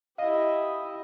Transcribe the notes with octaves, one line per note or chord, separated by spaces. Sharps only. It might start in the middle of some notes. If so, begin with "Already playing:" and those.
E4 G4 D#5 F5